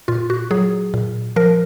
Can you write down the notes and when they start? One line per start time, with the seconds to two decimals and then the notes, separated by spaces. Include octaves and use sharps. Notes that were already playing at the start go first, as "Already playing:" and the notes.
0.08 A#2 F4
0.30 F#4
0.51 F#3 G#4
0.94 A#2
1.36 F3 A#4